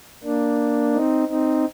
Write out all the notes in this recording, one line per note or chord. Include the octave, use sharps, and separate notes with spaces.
A#3 D4
C4 D#4
C4 D#4